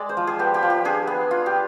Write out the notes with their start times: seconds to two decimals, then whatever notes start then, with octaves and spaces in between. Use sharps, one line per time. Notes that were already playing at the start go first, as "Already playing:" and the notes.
Already playing: G#3 D5
0.09 C5
0.17 F3
0.27 G#4
0.39 B3 G4
0.54 G4
0.63 F3
0.70 G4
0.85 D4 G#4
1.07 B3
1.31 F4
1.46 G4